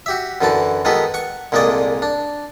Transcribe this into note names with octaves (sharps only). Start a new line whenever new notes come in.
F#4 G4 E5
F#2 D3 E3 F#4 A5
D#3 G#3 B3 F#4 A4 B4
F#5 C#6
C2 A#2 G#3 A3 G#4 D5
D4